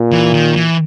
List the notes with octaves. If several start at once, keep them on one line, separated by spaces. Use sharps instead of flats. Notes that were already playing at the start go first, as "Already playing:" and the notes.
Already playing: A#2
E3
D#3
E3